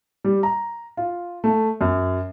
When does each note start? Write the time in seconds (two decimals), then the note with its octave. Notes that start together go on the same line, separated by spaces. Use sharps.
0.24 G3
0.43 A#5
0.97 F4
1.44 A3
1.81 F#2